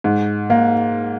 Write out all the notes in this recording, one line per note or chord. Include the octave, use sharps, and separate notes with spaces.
G#2
A#3